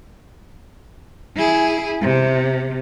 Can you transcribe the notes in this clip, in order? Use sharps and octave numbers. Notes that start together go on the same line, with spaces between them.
E4 G#4
C3